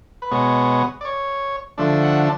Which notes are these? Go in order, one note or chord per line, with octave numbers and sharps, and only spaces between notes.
B4
B2 G#3 B3 C#5
D5
C#5
D3 F3 A3 D4
F#5